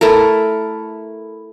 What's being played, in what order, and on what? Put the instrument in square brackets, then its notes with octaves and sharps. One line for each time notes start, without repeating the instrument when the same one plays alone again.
[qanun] A3 E4 A4 A#4